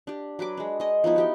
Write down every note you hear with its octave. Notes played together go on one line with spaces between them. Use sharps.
D4 G4
F#3 F#4 B4 D6
G#3 D4
G#3 D#5
F3 B3 D#4 E4
F#4 G4 G5